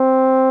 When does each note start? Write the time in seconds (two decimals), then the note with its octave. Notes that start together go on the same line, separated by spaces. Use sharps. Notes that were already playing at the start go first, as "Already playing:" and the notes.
Already playing: C4